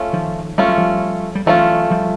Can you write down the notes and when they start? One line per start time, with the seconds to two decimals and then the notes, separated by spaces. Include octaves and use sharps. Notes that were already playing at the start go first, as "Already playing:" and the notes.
Already playing: A3 C#4 F4
0.13 D#3 F3
0.58 G3 A3 C#4 F4
0.68 F#3
0.78 F3 G3
1.35 G3
1.46 E3 F#3 A3 C#4 F4
1.91 F3 G3